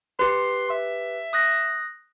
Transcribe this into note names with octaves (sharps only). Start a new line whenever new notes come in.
G4 B4 C6
E5
D#6 F#6 A#6